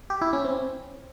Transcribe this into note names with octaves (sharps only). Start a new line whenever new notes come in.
G4
E4
C#4
C4